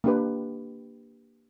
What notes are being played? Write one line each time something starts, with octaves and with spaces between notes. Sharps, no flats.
A#3 D4 G4 B4